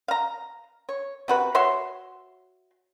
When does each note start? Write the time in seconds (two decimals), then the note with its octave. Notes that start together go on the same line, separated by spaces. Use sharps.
0.08 F5 A#5
0.89 C#5
1.28 C3 F#4 B4
1.55 F#4 C#5 E5 C6